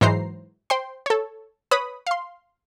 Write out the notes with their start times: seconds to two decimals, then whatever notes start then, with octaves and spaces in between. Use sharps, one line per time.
0.01 G#2 E3 F#3 C5 A#5 C7
0.70 C5 G5 C6
1.06 A4 C#5
1.71 B4 C#5 B5 D#6
2.07 F5 C6